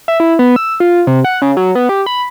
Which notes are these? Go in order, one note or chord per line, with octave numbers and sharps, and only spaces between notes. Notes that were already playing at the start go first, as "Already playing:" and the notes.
E5
E4
B3
E6
F4
C3
F#5
C#3
F#3
B3
G4
B5